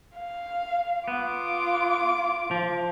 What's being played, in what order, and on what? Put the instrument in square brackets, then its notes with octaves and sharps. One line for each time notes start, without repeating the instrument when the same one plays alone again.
[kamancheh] F5
[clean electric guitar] B3 [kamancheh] F4 D6
[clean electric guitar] F3